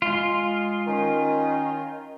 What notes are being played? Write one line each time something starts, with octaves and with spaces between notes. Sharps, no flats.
G#3 F4
D#3 C#4